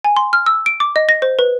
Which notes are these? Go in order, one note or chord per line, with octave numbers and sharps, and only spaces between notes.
G#5
C6
F6
E6
D7
D6
D#5
A#6
C5
B4